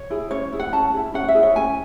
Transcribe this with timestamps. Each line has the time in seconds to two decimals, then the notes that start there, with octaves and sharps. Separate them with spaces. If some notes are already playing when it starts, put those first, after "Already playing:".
Already playing: C#5
0.10 E4 G#4
0.31 C#4 C#5
0.53 E4 G#4
0.60 F#5
0.72 C#4 A5
0.94 E4 G#4
1.14 C#4 F#5
1.28 E5
1.35 E4 G#4
1.43 C#5
1.56 C#4 G#5